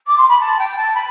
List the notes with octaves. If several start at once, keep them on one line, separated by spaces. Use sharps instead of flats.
D6
C6
B5
A5
G5
A5
B5